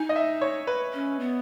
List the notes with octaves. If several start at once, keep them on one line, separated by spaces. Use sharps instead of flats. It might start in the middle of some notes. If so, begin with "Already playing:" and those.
Already playing: D#4 G#5
D#5
E5
C#5
B4
C#4
B3